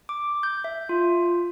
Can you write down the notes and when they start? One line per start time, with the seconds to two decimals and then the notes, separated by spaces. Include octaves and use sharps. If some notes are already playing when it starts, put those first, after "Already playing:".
0.09 D6
0.43 G6
0.64 E5
0.89 F4